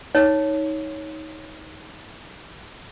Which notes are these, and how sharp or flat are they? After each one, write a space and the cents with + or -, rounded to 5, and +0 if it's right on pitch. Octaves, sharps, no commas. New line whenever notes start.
D#4 +20 C#5 +0